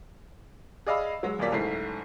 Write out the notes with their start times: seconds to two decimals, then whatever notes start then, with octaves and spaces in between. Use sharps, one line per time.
0.86 G#4 D5 D#5 F5 B5 E6
1.23 F#3 G#3
1.39 D#1 B1 A#2 A#3 D5 B6
1.52 F#1 G#2 A3 E4 C7